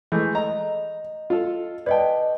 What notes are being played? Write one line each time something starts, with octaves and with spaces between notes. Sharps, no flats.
E3 G#3 A3 G6
D#5 A#5
F4 A4
B4 D5 D#5 G5 A5